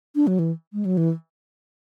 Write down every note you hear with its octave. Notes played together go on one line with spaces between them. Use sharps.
D4
F#3
E3
G#3
F#3
E3